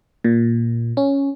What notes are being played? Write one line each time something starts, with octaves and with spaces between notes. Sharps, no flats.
A#2
C#4